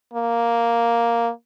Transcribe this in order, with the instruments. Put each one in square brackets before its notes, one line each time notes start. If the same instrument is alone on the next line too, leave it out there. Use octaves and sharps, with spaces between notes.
[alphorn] A#3